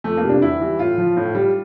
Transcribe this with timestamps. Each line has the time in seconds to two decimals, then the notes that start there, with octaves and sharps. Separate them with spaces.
0.04 F2 A3
0.17 A#3
0.24 C3 G3
0.29 D4
0.41 E2 E4
0.60 E3 G3
0.79 A2 F4
0.98 F3
1.17 A2
1.35 G3